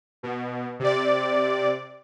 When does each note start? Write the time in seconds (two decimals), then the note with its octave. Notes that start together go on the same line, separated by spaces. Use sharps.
0.23 B2
0.79 C3 D5